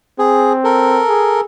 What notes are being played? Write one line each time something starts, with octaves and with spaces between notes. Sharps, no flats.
C4 G#4
A4 A#4
G#4